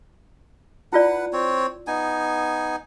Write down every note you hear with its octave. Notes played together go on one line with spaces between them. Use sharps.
E4 F4 B4 D5 F#5
C4 C#5
B3 D#4 G#5